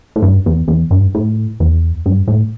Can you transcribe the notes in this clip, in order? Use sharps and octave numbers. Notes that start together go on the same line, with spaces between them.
A2
G2
E2
E2
G2
A2
E2
G2
A2